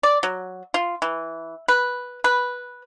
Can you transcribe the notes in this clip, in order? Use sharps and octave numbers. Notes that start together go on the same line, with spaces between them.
D5
F#3
F4
E3
B4
B4